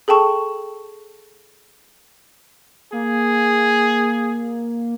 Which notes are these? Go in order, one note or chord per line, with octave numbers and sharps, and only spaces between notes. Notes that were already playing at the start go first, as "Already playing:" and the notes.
G#4 A4 G5 A5 C#6
A#3 G#4